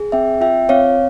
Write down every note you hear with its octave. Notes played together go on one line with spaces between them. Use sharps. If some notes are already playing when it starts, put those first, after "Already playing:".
Already playing: G#4
C4 E5 G5
F4 E5 G5
C4 C#5 F5